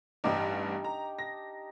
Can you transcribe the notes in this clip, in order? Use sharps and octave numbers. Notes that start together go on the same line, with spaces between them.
A1 G2 G3 D4 D#4 G4
A#5
A#6